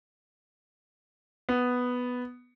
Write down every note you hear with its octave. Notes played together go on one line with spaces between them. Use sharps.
B3